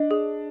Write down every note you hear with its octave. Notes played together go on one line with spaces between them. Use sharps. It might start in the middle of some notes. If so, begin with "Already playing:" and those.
Already playing: D4 D#5
G#4